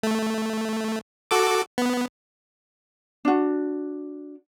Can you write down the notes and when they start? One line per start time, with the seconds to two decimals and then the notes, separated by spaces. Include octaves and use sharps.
0.03 A3
1.31 F#4 A4 D6
1.78 B3
3.25 D4 F#4